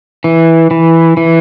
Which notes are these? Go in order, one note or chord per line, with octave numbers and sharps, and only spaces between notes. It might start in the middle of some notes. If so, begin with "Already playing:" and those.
E3
E3
E3